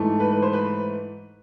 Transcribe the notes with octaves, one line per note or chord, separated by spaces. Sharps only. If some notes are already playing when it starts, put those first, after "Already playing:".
Already playing: G#2 E3 A3
B4
B4
C5
B4